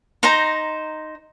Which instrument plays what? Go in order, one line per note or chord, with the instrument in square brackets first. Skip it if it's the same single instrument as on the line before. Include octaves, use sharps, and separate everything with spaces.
[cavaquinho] D#4 C5 A#5